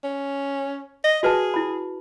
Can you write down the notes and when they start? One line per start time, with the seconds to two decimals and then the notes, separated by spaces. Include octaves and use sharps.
0.04 C#4
1.04 D#5
1.23 F#4 G#4 B4 A5
1.54 E4 B5